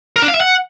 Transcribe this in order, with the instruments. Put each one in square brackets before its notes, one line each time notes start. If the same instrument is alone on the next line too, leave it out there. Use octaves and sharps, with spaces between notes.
[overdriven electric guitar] A#4
D4
F5
E5
F#5